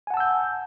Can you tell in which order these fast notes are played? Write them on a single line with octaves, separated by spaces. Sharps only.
G#5 F#5 A5 E6 G6